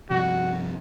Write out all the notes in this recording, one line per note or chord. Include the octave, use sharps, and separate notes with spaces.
G2 C3 F3 F#4